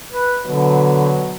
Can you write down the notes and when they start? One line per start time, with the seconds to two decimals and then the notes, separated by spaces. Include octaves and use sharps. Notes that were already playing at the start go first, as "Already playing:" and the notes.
0.12 B4
0.46 B2 D3 F#3 B4